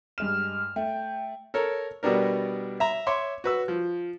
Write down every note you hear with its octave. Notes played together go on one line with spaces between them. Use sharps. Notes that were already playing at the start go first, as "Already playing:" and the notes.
G2 G#3 F6 E7
A3 G5
A4 A#4 C#5
B2 G3 B3 D4 A#4
E5 A#5
C#5 E5 C6 D6
F#4 B4 E6
F3